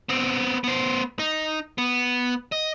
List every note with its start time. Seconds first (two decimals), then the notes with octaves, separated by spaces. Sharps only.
0.09 B3 C4
0.64 B3 C5
1.19 D#4
1.78 B3
2.52 D#5